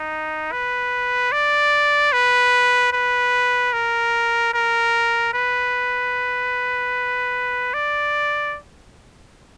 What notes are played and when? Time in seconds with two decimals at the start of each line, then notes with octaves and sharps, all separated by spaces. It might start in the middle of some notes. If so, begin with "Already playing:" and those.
Already playing: D#4
0.52 B4
1.32 D5
2.13 B4
2.93 B4
3.73 A#4
4.54 A#4
5.34 B4
7.73 D5